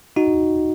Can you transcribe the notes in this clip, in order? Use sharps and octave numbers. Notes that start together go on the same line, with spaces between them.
D#4 F#4